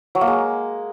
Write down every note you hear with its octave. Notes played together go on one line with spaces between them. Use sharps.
F#3
A#3
G#3